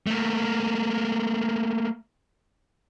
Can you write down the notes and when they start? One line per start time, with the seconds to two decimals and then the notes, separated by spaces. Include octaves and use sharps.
0.07 A3 A#3